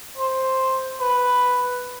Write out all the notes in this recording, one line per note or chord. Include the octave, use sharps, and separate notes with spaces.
C5
B4